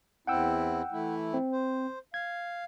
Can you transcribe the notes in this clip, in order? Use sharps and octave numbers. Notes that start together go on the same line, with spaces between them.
E2 C4 E4 F#5 G5 E6
E3 A3 E4
C4
C5
F5 G#6